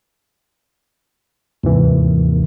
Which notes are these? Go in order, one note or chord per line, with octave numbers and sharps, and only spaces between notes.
D#2 G#2 C3 E3